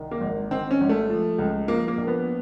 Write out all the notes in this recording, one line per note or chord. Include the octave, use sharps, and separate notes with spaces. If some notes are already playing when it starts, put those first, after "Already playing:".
Already playing: C2 D#3
A#3
G#1
D#3 C4
C#4
G#1
A3
F3
C#2
F3 A#3
A#3
A#1
B3